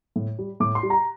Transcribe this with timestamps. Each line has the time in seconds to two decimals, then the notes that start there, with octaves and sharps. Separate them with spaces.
0.16 A2
0.39 G3
0.60 A2 D6
0.75 C6
0.83 G3
0.90 A#5